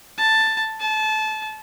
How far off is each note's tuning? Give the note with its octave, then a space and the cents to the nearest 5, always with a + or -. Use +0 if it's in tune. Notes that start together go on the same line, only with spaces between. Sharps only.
A5 +5
A5 -25